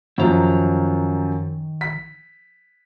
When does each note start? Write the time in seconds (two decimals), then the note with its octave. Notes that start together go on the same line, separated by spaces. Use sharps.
0.18 F#2 D#3 F3 A#5
1.81 B6